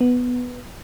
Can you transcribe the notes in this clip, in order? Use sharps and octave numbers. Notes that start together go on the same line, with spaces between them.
B3